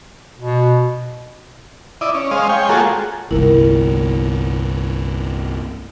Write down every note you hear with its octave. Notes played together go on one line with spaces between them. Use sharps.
B2
E4 D5 D#5
C#4
G#3 C5 D#5 F5
C#5 G5 G#5
G#3 A#3 F4 F#4 G#4 A4
G1 C2 E4 A#4